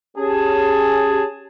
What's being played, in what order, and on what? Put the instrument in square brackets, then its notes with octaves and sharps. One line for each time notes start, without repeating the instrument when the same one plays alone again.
[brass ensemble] C#4 G4 G#4 A5